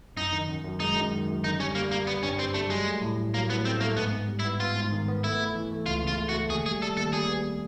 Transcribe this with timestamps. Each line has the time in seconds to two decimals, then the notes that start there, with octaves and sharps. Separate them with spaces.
0.16 F#2 D#4
0.33 D#3
0.49 F#2
0.64 F#2
0.80 G#3 D#4
0.96 F#2
1.12 D#3
1.28 F#2
1.44 D3 D#4
1.59 G3 C#4
1.75 G3 A#3
1.91 G3 A#3
2.07 G3 B3
2.22 G2 C#4
2.38 G3 C4
2.54 G3 A3
2.70 F#3 G#3
2.86 A3
3.02 A2
3.17 A2
3.34 F#3 A#3
3.49 A2 B3
3.65 A3 C4
3.81 A3 A#3
3.96 G#2 B3
4.12 B3
4.28 G3
4.40 E4
4.45 B3
4.60 B3 F4
4.76 G#2
4.92 D#3
5.08 B3
5.23 A3 E4
5.40 A3
5.55 E3
5.72 A3
5.86 C#2 F4
6.03 C#3 F4
6.18 A3
6.29 F#4
6.34 A3
6.50 D#2 G#4
6.66 G3 G#4
6.82 G3 A4
6.97 D#2 A4
7.13 G3 G#4
7.29 B3